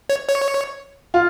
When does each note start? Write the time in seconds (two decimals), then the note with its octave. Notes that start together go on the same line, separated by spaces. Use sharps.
0.09 C#5
0.29 C#5
1.14 F4